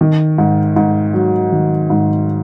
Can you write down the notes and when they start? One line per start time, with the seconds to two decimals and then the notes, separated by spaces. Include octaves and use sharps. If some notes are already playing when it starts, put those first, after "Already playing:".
0.01 D#3
0.38 G#2
0.76 G#2
1.14 F#3
1.52 D#3
1.90 G#2